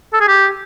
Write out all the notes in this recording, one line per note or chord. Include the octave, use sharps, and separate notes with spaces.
A4
G#4
G4